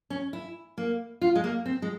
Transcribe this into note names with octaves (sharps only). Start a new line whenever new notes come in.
C#4
E4
A#3
F4
G#3
A#3
C4
G#3